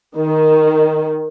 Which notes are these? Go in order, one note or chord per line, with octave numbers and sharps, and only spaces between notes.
D#3